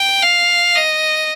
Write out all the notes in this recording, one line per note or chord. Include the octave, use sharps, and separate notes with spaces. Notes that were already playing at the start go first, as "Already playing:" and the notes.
Already playing: G5
F5
D#5